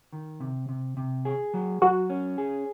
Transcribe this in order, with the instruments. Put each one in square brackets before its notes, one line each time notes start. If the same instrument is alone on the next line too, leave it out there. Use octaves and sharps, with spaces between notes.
[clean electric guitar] D#3
C3
C3
C3
G#4
F#3
[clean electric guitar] F#3 [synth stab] F#4
[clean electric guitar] C#4
G#4